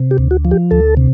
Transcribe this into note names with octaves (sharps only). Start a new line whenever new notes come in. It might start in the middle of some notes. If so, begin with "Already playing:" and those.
Already playing: C3
G4
D2
F#4
F3
G4
D2 A4
C3